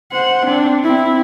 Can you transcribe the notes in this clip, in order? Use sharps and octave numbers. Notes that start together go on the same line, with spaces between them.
C5 F#5
C4 D4
C4 E4